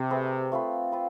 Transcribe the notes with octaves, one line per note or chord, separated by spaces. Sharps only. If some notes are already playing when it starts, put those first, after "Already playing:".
Already playing: C3
A3 C4 G#4 B4
A3 C4 F4 B4
C4 F4 B4